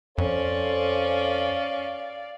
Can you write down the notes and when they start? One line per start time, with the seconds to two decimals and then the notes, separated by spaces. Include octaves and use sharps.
0.18 F2 C#4 A4 C5 D5 F5